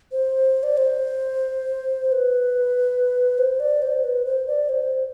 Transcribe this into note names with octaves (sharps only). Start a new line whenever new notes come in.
C5
D5
C5
C5
B4
C5
D5
C5
B4
C5
D5
C5